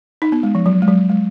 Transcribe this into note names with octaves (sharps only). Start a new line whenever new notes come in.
D#4
B3
G#3
F3
F#3
G#3
F#3
G#3